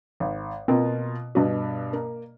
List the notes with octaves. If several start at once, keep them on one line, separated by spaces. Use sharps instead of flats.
G#1
B2 A#3 C4 F4
G2 B2 F#4 B4
A#3